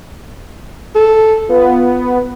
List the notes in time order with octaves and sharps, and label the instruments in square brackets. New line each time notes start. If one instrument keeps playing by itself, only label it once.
[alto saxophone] A4
[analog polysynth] B3 [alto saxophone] F4